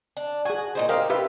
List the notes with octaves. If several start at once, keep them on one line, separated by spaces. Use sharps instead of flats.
D4
F#4 G#4 G#5
A#2 D#4 C5
C4 G4 A#4 D#5 F5
F4 G4 B4 E5